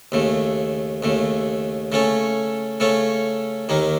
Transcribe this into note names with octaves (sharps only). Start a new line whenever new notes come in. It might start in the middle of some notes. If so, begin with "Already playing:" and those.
D#2 C#3 A3
D#2 C#3 A3
C#3 A3 C#4 A4
C#3 A3 C#4 A4
D#2 D#3 A#3 D#4